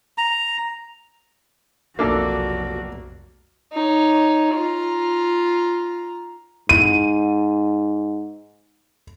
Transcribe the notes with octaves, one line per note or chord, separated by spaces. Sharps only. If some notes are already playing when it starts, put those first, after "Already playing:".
A#5
F1 B1 A#3 D4 F#4 A4
D#4 C#5
F4 A#5
G#2 D#7